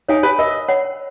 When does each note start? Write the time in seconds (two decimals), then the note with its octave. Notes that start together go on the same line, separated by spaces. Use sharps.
0.08 D#4 C#5 F5 G#5
0.23 B4
0.38 A#4 D#5
0.68 C#5 F#5 B5